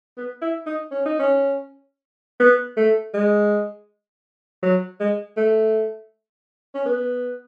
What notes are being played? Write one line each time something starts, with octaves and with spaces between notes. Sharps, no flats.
B3
E4
D#4
C#4
D#4
C#4
B3
A3
G#3
F#3
G#3
A3
C#4
B3